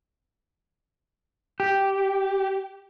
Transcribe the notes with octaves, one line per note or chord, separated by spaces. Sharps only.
G4